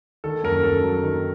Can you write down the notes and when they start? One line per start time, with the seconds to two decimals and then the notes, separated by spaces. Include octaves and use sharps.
0.24 D#3 A4
0.44 F#2 A#4
0.63 F#2 A4
0.83 F#3
1.03 D#3